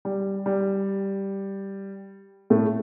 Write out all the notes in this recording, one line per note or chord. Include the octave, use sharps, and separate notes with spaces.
G3
G3
A2 A3